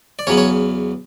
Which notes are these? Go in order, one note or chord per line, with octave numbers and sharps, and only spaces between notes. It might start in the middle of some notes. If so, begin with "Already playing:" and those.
D5
E2 C#3 F#3 B3 C#5
C#5